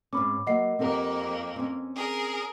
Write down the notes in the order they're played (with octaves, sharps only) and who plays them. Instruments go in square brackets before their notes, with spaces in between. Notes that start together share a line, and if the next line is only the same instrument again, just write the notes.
[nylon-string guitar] G#2 C4 C#4 [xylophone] B5 D6
[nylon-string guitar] F#3 A#3 [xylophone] D#5 F#5 C7
[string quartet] F2 A#3 [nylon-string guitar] C4 G4 A#4
[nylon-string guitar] C4 C#4
[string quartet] G#4 A#4